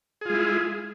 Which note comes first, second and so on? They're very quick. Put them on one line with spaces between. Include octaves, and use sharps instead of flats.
G#4 F4 G#3 E4